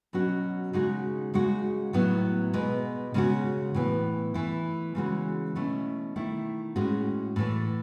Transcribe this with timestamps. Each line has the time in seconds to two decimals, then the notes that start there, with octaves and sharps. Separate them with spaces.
0.13 B2 F#3 C#4 F#4
0.73 C#3 G#3 D#4 F#4
1.34 C#3 G#3 D#4 F#4
1.93 A2 F#3 B3 E4
2.53 B2 G#3 B3
3.14 C#3 G#3 C#4 F#4
3.74 A2 E3 B3
4.34 E3 A3 E4
4.95 C#3 E3 G#3 C#4 F#4
5.55 B2 A3 C#4 E4
6.16 D#3 A3 E4
6.76 A2 G#3 C#4 F#4
7.36 A2 E3 A3